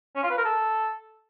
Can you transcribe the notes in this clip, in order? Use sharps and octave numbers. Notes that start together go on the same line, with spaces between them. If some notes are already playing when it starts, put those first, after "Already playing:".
C#4
F4
B4
A#4
A4